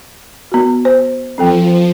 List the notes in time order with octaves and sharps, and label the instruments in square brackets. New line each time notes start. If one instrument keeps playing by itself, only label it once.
[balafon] B3 F#4
C5
[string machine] F3 [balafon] C4 A4 G5